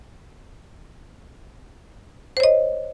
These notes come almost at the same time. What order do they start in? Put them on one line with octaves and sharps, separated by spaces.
C5 C#5 D#5